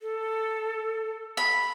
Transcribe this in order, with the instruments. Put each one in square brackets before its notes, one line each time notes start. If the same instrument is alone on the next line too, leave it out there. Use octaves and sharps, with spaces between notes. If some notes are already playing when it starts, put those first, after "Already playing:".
[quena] A4
[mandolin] B5